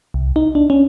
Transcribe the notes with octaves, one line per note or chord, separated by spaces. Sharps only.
C2
D#4
D4
C#4